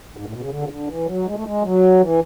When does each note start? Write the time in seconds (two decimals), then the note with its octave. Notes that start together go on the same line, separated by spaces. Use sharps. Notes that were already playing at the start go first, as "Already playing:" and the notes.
0.17 G#2
0.25 A2
0.33 B2
0.42 C#3
0.49 D3
0.62 C#3
0.69 D3
0.87 E3
1.06 F#3
1.25 G#3
1.35 A3
1.44 G#3
1.62 F#3
2.00 E3